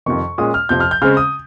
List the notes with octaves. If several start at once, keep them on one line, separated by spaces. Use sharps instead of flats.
F2 C3 D#3 C#6
A#2 G#3 C#4 D#6
F6
F2 C3 F3 G6
F6
G6
C#3 G#3 C4 F6
D#6